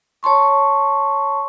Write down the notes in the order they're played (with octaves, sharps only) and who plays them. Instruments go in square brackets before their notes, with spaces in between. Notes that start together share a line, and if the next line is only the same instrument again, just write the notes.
[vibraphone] C#5 A5 C6 C#6